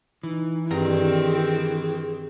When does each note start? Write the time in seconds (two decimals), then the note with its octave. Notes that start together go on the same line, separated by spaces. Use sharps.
0.23 E3 D#4
0.71 G2 D#3 C4 G#4 A#5